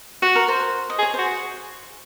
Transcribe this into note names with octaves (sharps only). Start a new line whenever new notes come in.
F#4 F#5
A#4
C5
D#5
G#4
C#5
F#4 C5